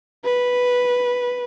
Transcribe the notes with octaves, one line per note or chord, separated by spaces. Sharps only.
B4